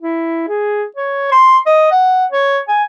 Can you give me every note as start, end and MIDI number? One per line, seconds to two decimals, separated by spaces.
0.02 0.45 64
0.48 0.84 68
0.96 1.32 73
1.32 1.58 84
1.66 1.90 75
1.91 2.25 78
2.32 2.60 73
2.68 2.83 80